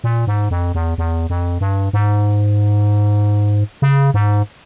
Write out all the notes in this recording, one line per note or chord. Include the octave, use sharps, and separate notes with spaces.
A#2
G#2
F2
E2
E2
F2
G2
G#2
C#3
G#2